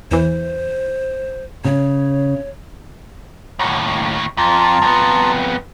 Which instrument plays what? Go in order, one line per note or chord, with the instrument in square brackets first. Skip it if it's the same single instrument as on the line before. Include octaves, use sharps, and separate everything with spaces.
[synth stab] E2 E3 [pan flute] C5
[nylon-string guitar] C#3 [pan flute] C#5
[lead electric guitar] D#2 A2 [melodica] C#5 F#5 C#6
[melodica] C#6
[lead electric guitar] F2 [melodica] F4 A5 A#5
[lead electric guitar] F2 B3